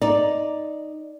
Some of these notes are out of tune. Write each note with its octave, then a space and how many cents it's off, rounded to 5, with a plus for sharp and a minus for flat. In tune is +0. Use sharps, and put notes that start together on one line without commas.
D#4 +0 D5 +0